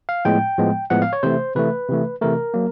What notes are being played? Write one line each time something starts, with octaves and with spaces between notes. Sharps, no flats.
F5
A2 F3 G#3 B3 G5
A2 F3 G#3 B3
A2 F3 G#3 B3 F#5
F5
C#5
C3 E3 A3 C5
C3 E3 A3 B4
C3 E3 A3
C3 E3 A3 A#4
F#3 A#3